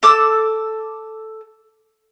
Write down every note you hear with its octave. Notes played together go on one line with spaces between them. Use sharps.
A4 D6 E6